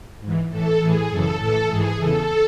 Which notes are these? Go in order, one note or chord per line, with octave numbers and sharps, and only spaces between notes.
G#2
E3
A2 E3 A4
A2 E3 G#4
F#2 C#3 E3 A4
A2 E3 A4
G#2 E3 G#4
E2 C#3 E3 A4